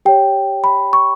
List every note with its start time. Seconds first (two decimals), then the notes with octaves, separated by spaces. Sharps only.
0.05 G4 C#5 G5
0.64 B5
0.93 C#6